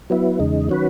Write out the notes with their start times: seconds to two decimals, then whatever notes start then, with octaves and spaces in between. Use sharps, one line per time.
0.10 F#3 B3 E4
0.39 E2 C#3 G#3 D#4
0.69 D#3 F#3 C#4 F#4 B4